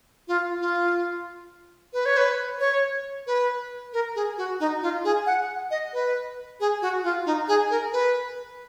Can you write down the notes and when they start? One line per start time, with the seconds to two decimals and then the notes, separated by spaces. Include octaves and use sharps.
0.28 F4
0.60 F4
1.93 B4
2.05 C#5
2.17 B4
2.60 C#5
3.27 B4
3.93 A#4
4.15 G#4
4.37 F#4
4.60 D#4
4.82 F4
5.04 G#4
5.26 F#5
5.71 D#5
5.93 B4
6.60 G#4
6.81 F#4
7.03 F4
7.26 D#4
7.48 G#4
7.70 A#4
7.93 B4